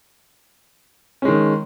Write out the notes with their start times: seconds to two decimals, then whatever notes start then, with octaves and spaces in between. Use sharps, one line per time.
1.22 C#4
1.25 G#3
1.28 D#3